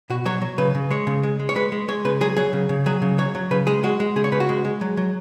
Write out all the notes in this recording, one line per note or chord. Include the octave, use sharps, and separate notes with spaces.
B2 F#4
F#3 C#5
F#3
C#3 B4
C#3
G#3 C#5
C#3
G#3
G#3
C#5
G#3 B4
G#3
G#3 C#5
C#3 B4
F#3 G#4
F#3 G#4
C#3
C#3
F#3 G#4
C#3
F#3 C#5
F#3
C#3 B4
G#3 G#4
G#3 F#4
G#3
C#3 G#4
C#5
C#3 B4
F#4
G#3
G#3
F#3
F#3